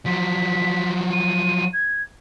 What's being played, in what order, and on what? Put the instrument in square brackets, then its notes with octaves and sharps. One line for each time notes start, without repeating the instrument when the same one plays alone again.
[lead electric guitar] F3 F#3 [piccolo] B6
[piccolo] D#7
G#6